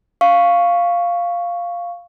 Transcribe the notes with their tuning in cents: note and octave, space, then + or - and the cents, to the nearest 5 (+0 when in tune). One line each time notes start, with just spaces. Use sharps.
F5 +0 C#6 +0